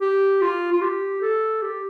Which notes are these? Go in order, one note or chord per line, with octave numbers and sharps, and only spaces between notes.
G4
F4
F4
G4
A4
G4